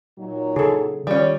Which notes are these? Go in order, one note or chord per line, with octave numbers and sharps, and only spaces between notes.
A#2 F#3 D#4
C#3 G#4 A4
D#3 G3 C#4 F4